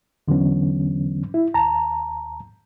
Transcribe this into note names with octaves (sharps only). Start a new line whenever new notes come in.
E2 D3 E3 F#3 B3 C#4
E4
D#2 A5 A#5